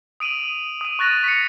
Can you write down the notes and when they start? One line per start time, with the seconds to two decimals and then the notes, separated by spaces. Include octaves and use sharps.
0.20 D#6 D7 D#7 F7 F#7
0.81 D#6 D#7
0.99 C#6 F#6 A6 A#6 D#7 F7
1.24 B6 C#7